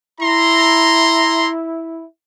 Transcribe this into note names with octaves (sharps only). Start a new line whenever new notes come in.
E4 A#5 C6